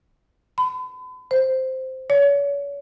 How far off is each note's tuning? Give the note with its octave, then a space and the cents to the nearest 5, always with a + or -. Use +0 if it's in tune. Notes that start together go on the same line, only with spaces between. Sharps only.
B5 +40
C5 -5
C#5 +35